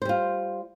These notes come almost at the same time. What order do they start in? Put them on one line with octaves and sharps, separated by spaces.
C5 G3 F4